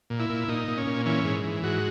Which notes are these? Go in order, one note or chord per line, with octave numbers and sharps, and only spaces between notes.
A#2
E4
A#2
A#2 D#4
A#2
C#4
A#2
E3 C#4
G#2
E3
G#2 F#4